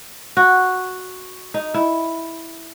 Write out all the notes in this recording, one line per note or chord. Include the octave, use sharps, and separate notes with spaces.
F#4
D#4
E4